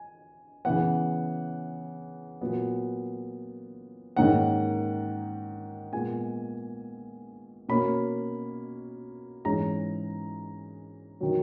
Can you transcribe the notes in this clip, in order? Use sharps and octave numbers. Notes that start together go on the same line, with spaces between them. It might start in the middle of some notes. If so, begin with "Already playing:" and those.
Already playing: G#5
C#3 E3 B3 F#5
A#2 F#3 B3
G#2 D#3 A#3 C#4 F#5
A#2 G#3 B3 G#5
B2 A#3 C#4 B5
G#2 E3 G#3 C#4 A#5
D#3 F#3